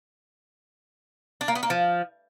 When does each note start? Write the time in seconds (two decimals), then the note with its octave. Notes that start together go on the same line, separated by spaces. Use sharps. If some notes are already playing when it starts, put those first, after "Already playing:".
1.41 D4
1.48 A#3
1.55 B3
1.63 A#3
1.70 F3